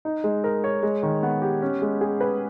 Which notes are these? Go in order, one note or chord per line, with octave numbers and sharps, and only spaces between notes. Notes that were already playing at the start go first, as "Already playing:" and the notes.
D#4
G#3
A#4
C#5
G#3
D#3
B3
G4
C#4
G#3
G#4
B4